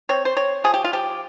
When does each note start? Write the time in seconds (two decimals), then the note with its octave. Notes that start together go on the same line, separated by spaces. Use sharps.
0.09 C4 C#5
0.25 C5
0.36 C4 C#5
0.64 F3 G#4
0.74 G4
0.84 F4
0.93 F3 G4